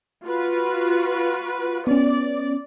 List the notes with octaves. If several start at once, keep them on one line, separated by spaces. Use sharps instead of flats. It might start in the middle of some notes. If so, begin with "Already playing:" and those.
F4 F#4 B4
B3 C#4 D5